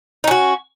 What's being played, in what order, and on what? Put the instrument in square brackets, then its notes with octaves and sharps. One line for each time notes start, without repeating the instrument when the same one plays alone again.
[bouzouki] D#4
C#4
F#4